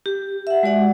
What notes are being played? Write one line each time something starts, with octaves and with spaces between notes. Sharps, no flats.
G4
E5 F#5
G#3 F#4 D5 F#5